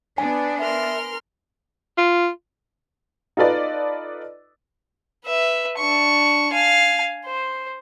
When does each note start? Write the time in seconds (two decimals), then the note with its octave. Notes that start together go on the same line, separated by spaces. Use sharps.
0.18 B3 D4 G#5
0.59 A#4 E5 C6 F6
1.98 F4
3.37 D#4 F4 A4 B4 D5 D#5
5.25 B4 E5
5.78 D4 C#6
6.53 F5 G#5
7.26 C5